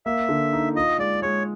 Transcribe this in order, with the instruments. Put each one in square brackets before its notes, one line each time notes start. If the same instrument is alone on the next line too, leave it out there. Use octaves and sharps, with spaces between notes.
[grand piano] A#3 [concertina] E5
[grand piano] D3
D#4
[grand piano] F4 [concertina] D#5
[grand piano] G#3 [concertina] D5
[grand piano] G#3 [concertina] C#5